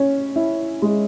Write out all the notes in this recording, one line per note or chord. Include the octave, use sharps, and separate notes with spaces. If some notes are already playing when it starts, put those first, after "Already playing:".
Already playing: C#4
E4
G#3